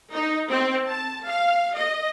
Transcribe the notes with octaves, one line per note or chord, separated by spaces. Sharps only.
D#4
C4
A5
F5
D#5